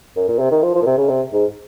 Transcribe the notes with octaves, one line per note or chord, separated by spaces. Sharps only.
F#2
A#2
C3
D#3
F3
F3
A#2
C3
C#3
C3
G#2